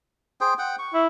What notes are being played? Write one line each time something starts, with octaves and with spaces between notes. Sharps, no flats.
G#4 C5 G5
F#5 G5
C#6
E4